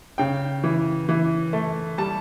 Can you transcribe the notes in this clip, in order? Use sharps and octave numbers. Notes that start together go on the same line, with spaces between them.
C#3 G5
E3
E3
A3
G3 A5